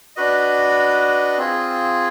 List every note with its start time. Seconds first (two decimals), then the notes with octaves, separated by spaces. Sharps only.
0.16 D4 F#4 B4 D#5
1.38 C4 F4 G#4